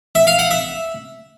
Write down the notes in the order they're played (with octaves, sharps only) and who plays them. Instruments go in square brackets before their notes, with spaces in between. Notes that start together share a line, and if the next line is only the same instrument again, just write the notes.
[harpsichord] E5
F5
F#5
E5